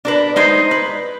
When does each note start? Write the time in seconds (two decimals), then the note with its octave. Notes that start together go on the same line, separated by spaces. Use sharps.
0.05 D4 A#4 B4
0.36 G#3 D#4 C5
0.71 B4